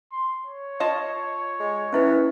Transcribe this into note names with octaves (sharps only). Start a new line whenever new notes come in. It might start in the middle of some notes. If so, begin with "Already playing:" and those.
C6
C#5
F4 D#5 A5
G#3
E3 C#4 E4 B4